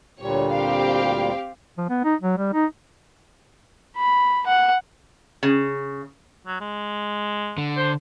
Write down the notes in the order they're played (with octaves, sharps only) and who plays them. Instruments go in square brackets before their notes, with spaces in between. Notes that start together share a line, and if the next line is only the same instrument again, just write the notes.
[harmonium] D2 A#2 G3 [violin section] C#5
[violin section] C4 G4 F5
[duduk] F3
B3
D#4
F#3
G3
D#4
[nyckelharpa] B5
F#5
[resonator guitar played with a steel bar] C#3
[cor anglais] F#3
G#3
[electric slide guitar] D3
[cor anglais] C5